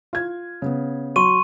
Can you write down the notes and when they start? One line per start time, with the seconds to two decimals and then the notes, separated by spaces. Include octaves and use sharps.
0.13 F4 G#6
0.62 C#3 B3
1.16 F#3 C6 C#6 D#7